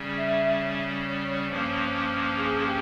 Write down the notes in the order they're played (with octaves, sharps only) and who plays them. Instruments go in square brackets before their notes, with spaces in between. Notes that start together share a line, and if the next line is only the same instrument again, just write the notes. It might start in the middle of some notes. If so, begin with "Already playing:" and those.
Already playing: [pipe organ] C#3 G3 C#4
[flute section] E5
C#5
[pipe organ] G2 F3 A#3 C#4
[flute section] G#4
G4